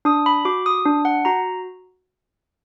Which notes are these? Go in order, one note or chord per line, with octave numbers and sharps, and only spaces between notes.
D4 D#6
B5
F#4 D6
D#6
D4
F#5
F#4 A#5